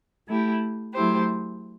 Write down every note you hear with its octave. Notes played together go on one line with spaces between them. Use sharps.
A3 E4 G4
F#3 A3 E4 G4 C5